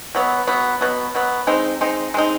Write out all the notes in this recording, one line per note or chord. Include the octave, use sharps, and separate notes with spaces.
B2 F#3 B3
B2 F#3 B3
B2 F#3 B3
B2 F#3 B3
G#3 C4 D#4
G#3 C4 D#4
G#3 C4 D#4